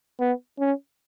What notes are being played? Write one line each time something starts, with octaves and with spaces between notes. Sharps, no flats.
B3
C#4